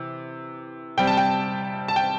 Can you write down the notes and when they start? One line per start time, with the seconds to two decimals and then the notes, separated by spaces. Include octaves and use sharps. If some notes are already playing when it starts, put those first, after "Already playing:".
Already playing: C3 E3
0.97 C3 G3 G5
1.07 A5
1.17 G5
1.88 A5
1.96 G5